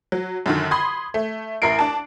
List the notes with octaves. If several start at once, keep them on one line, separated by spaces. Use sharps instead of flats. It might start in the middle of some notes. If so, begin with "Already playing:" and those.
F#3
F#2 D3 D#3
B5 C6 D#6 G#6
A3
A1 E4 A#4 C7 D7
D4 A5